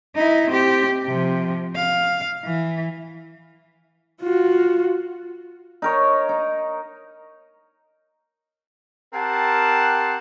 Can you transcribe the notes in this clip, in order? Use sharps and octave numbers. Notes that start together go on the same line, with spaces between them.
D#4 E4
C4 G4
C3 F3
F5
E3
F4 F#4
D#4 A#4 C#5
D#4
C4 G4 A#4 F#5 A5